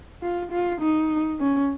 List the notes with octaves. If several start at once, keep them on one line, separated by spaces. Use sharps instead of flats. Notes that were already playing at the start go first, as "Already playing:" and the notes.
F4
F4
D#4
C#4